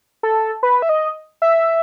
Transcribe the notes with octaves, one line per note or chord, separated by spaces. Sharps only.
A4
B4
E5
D#5
E5